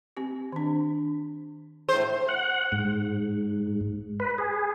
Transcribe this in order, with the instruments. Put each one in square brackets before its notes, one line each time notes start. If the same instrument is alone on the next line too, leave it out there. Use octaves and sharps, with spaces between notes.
[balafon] C4 G4
D#3 D4
[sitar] A2 C5 [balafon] G#4
[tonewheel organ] F#5
G#2
B4
G#4